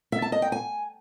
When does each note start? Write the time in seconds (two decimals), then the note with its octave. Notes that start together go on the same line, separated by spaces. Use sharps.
0.12 E5
0.22 A5
0.32 D#5
0.42 G5
0.52 G#5